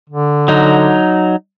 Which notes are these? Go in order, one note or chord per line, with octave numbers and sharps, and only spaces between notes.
D3
F#3 D#4